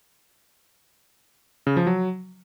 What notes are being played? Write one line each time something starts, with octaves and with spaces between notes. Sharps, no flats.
C#3
F3
F#3